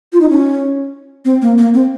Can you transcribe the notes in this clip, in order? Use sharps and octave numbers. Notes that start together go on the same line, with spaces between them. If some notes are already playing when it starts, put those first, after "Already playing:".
F4
D#4
C#4
C4
A#3
A#3
C4